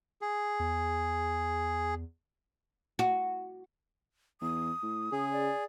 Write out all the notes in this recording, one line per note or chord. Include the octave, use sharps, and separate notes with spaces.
G#4
E2
F#4
E2 D#6
A2
C#3 G#4
D5